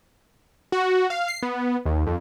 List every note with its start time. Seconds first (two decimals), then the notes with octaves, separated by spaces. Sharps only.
0.72 F#4
1.10 F5
1.28 C7
1.42 B3
1.86 D#2
2.07 F2